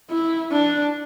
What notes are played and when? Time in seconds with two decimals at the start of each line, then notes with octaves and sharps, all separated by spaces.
0.10 E4
0.52 D4